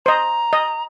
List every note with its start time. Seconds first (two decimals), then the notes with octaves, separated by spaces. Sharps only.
0.06 C5 D#5 A#5
0.53 D#5